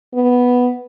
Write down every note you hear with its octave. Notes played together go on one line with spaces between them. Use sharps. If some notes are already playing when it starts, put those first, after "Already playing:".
B3